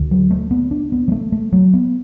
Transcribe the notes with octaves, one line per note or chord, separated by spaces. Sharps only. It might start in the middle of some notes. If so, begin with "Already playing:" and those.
Already playing: D2 D3
F#3
A3
B3
D4
B3
F#3
A3
A3
F#3
B3